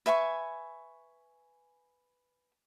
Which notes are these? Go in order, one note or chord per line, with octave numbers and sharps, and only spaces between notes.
B4 E5 G#5 C#6